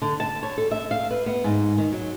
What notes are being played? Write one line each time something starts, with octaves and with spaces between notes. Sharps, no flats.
D3
A5
C#5
A4
E5
F5
B4
B3
G#2
D#3
F#3